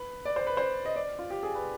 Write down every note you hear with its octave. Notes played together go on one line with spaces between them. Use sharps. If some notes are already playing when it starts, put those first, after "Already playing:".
Already playing: B4
D5
C5
B4
C5
D#5
D5
F4
G4
G#4
B4